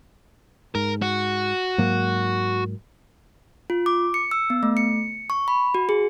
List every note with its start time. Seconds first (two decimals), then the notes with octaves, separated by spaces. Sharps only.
0.75 G#2 A#4
1.02 F#4
1.78 G#2 F#3 A#3
3.70 F4
3.86 D6
4.14 C#7
4.31 E6
4.50 B3
4.63 A3
4.77 C#7
5.30 C#6
5.48 B5
5.74 F#4
5.89 G#4